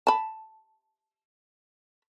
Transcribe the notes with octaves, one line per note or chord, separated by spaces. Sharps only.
A5 B5